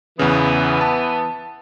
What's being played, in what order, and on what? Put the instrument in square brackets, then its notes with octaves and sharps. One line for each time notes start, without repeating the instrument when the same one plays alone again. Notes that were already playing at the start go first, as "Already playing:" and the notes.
[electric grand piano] E2 C#3 [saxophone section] E3 B3
[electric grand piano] A5